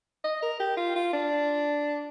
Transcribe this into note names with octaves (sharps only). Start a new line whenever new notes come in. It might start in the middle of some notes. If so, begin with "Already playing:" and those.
D#5
A#4
G4
F4
F4
D4